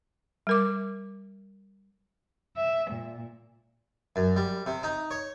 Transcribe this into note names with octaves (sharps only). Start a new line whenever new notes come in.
G3 A#4 D6
E5
A#2
F#2
G3
C3
D#4
C#5